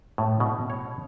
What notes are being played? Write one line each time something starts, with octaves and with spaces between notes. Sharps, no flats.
A2
B2
C#5